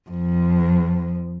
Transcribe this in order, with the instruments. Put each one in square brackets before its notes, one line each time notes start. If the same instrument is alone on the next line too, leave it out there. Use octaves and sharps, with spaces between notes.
[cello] F2